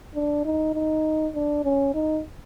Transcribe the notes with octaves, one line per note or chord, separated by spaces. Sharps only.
D4
D#4
D#4
D4
C#4
D#4